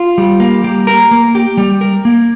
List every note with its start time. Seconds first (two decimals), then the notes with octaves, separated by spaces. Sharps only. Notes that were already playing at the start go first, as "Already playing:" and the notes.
Already playing: F4
0.18 G3
0.40 A#3
0.64 G3
0.87 A#4
1.11 A#3
1.35 G4
1.57 G3
1.81 A#4
2.05 A#3